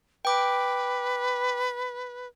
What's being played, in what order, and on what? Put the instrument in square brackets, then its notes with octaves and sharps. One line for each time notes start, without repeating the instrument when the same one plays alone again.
[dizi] B4 [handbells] G5 D6